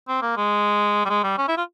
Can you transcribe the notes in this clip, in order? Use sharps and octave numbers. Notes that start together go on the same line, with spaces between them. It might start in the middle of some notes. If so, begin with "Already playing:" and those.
C4
A#3
G#3
G3
G#3
G3
C#4
E4
F4